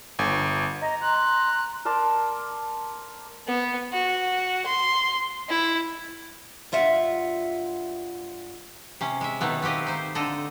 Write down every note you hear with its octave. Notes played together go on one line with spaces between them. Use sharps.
G1
D#5 A#5
C6 F#6
A#5
A#4 D5 A5 C6
B3
F#4
C6
E4
G2 F4 E5 F#5
C3 C#4
G#3 E5
B2 D#3 A3 B3
B3 C4 G4 D#5 F5
D#4 C5
D3 A4 D#5